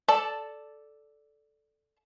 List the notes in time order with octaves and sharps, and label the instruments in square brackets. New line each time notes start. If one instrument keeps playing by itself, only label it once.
[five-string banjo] A4 D5 A5